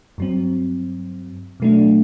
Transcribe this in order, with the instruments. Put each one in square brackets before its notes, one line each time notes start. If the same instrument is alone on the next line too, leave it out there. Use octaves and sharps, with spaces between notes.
[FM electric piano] G2 F#3 C4
B2 F#3 A3 D4